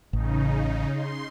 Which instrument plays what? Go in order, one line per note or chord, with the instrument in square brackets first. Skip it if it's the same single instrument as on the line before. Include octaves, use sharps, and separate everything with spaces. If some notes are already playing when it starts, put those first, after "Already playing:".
[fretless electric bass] A1 [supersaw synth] C#3 D#4
[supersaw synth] C6